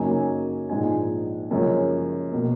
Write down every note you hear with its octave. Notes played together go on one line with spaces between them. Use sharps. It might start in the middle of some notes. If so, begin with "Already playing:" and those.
Already playing: F#2 C#3 F#3 A#3 D#4 G#5
A#1 G#2 F3 G#3 D#4 G#5
F#1 F#2 F3 G#3 C#5
B2 A#3